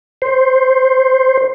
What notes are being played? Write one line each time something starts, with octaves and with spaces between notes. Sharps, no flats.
C5